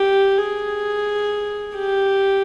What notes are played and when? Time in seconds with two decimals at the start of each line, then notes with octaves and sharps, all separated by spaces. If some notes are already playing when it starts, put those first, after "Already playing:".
Already playing: G4
0.38 G#4
1.76 G4